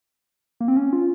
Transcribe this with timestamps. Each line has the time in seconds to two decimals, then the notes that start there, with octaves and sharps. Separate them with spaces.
0.60 A#3
0.68 C4
0.77 C#4
0.93 F4